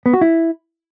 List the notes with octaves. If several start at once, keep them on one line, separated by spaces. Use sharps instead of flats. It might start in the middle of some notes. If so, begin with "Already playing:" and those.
B3
F#4
E4